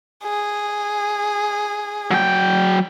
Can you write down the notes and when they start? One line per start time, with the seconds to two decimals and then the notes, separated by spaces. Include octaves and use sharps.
0.24 G#4
2.11 F#3 G5